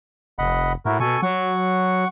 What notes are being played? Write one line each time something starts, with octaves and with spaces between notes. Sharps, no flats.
F1 D#5 F#5 B5
A2 E4 F#4 A#4
B2 A4 G#5 C#6
F#3 F#5 C#6